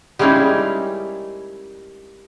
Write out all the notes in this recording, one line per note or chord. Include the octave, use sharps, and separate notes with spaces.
G3 G#3 A#3 C#4 D#4 E4